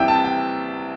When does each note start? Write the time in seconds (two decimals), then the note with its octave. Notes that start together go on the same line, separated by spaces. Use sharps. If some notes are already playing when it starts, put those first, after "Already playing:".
Already playing: C2 C3 E3 E5 G5
0.08 A5
0.25 G5